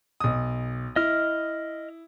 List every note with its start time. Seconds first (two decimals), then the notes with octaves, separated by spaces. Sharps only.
0.20 B1 D#6
0.96 E4 D#5 F6